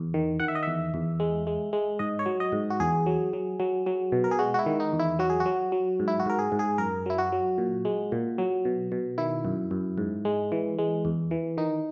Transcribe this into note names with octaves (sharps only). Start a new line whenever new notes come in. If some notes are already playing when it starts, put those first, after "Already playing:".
Already playing: E2
D#3
D#3 F#5
E5
D#5
E2 E5
E2
G#3
G#3
G#3
G#2 D#5
C#5
F#3
D#5
G#2
F#4
E2 G#4
F#3
F#3
F#3
F#3
B2
A#4
G#4
G#3 F#4
F#4
E4
D#3
D#4
E2
E4
F#3 F#4
G#4
F#4
F#3
F#3
G#2
E4
F#4
G#2 A#4
G#4
G#2
G#4
F#2 A#4
F#3 E4
F#4
F#3
A#2
G#3
A#2
F#3
B2
B2
D#3 E4
F#2
F#2
G#2
G#3
E3
G#3
E2
E3
D#3 D#4